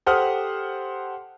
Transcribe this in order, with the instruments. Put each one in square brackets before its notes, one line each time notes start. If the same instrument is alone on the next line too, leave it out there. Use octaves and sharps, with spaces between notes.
[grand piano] G4 A4 C5 F#5 D#6 F6